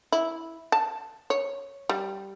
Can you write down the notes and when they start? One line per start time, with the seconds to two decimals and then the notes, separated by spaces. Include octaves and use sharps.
0.12 E4
0.72 A5
1.30 C#5
1.89 G3